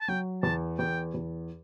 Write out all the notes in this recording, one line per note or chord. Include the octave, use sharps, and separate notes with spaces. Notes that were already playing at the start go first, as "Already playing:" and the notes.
A5
F#3 G5
E2 A5
E2 G5
E2